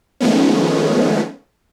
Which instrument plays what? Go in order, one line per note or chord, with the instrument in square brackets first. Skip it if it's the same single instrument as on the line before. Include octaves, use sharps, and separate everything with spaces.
[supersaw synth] D#3 F3 G#3 A3 B3 C#4